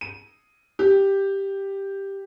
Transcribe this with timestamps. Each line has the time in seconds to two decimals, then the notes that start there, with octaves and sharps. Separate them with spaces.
0.01 D#7
0.79 G4